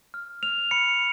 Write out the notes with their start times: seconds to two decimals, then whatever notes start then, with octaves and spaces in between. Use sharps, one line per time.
0.14 F6
0.43 F6 F7
0.71 B5 C#7